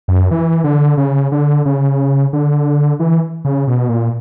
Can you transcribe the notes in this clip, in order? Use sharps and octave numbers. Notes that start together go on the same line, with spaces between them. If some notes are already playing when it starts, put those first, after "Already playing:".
F#2
E3
D3
C#3
D3
C#3
D3
E3
C#3
B2
A#2